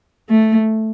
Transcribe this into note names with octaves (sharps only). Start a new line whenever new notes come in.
A3